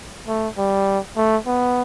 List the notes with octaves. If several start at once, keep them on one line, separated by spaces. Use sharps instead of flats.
A3
G3
A3
B3